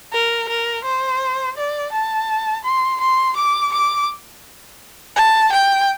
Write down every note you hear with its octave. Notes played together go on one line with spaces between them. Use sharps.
A#4
A#4
C5
D5
A5
C6
C6
D6
D6
A5
G5